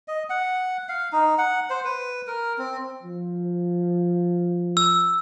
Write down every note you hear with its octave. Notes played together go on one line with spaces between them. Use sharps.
D#5
F#5
F5
D#4
F#5
C5
B4
A#4
C4
F3
E6